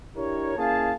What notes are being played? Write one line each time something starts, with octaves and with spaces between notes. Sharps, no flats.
D4 E4 G4 A#4 C#5
A#3 C#4 E4 G#4 F5 A5